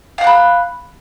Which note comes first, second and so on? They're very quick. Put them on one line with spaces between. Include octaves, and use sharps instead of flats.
F5 F#5 F#6 B5